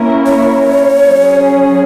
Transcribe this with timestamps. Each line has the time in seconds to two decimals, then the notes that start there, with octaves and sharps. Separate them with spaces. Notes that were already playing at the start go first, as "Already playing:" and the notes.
Already playing: A#3 C#4 E4 A#4
0.26 C#5
1.02 F#3 C#4 G#4